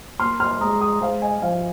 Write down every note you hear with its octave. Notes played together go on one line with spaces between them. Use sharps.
A#3 C6 F6
C6 F6
G#3 A#5 D#6
A#5 D#6
G#3 C5 F5
D#5 G#5
F3 C5 F5